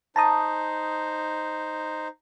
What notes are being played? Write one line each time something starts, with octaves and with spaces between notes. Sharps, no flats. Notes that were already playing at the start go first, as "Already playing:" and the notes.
D#4 C5 A5 A#5 D#6